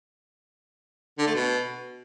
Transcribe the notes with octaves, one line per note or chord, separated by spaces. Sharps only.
D3
A3
B2